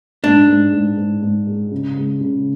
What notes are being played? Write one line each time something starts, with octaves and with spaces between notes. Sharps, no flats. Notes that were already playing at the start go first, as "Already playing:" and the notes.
G#2 D4
G#2
G#2
G#2
G#2
G#3
C#3
G#3
C#3